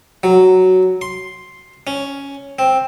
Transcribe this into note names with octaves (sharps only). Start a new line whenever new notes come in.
F#3
C6
C#4
C4